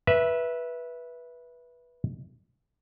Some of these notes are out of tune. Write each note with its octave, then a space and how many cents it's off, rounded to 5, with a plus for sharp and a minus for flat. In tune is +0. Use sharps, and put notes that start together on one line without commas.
B4 -15 E5 +0